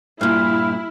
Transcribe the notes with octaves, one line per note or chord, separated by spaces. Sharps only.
G2 A#2 E4 F5